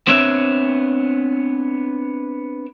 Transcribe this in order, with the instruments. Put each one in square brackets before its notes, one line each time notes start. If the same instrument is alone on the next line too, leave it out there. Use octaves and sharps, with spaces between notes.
[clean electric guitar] B3 C4 D4 C#5 E5